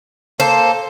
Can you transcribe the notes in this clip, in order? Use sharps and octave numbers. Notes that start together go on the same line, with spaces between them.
A#3 A4 C5